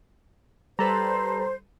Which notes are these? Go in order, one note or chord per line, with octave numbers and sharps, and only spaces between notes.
G3 A4 B4 C5 A#5